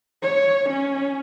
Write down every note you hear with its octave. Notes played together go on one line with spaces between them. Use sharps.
C#5
C#4